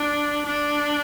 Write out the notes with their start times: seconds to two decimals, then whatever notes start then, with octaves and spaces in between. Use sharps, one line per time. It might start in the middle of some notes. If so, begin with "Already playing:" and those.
Already playing: D4
0.46 D4